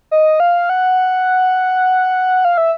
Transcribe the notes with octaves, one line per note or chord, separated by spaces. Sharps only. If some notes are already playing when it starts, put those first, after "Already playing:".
D#5
F5
F#5
F5
E5